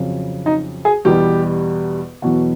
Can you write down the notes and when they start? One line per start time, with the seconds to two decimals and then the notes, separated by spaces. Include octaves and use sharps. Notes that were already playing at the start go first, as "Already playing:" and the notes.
Already playing: F2 C#3 F#3
0.46 D#4
0.85 G#4
1.05 E2 B2 G3 G4
2.22 E2 B2 F#3 F#4